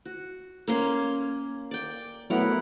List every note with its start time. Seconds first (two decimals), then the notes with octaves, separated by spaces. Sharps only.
0.05 F#4
0.68 A#3 C#4 C6
1.71 D5 G5
2.30 F#3 A3 B3 E4 A#4 F#5